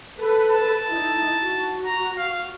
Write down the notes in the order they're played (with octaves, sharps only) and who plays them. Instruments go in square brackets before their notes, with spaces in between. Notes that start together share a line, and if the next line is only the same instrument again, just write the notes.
[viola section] A4 B4
[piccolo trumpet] A5
[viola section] D#4 E4
F#4
[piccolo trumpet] A#5
F5